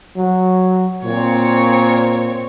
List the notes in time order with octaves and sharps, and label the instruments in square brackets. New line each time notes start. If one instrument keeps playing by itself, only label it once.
[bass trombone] F#3
[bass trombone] A#2 [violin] C4 C#5